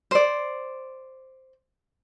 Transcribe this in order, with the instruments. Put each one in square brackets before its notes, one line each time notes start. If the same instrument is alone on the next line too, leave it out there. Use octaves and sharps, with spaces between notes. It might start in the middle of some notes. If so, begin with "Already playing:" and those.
[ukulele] C5 D5